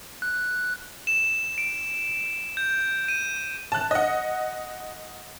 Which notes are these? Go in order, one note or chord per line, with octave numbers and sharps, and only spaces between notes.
F#6
E7
D7
G6
D#7
A5 F#6
D#5 F#5